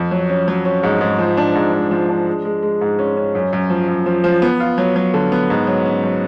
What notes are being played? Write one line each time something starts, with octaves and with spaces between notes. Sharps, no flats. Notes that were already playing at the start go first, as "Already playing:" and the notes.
Already playing: F2
F#3
C#4
F#3
C#4
G#2
G#2
F3
D4
G#2
G#2
F3
D4
G#3
G#3
G#3
G#2
C#4
C#4
F#2
F#2
F3
F#2
F3
F3
B3
F4
F#3
F#3
D3
B3
G#2
F#3
C#4
F#3